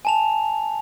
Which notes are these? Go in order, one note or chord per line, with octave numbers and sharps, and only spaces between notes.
G#5 A5 F7